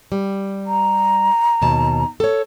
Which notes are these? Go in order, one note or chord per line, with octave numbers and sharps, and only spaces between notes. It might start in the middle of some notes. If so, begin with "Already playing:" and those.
G3
A#5
D#2 B2 A5
A4 C#5